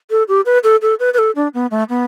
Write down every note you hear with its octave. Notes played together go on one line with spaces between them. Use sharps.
A4
G4
B4
A4
A4
B4
B4
A4
D4
B3
A3
B3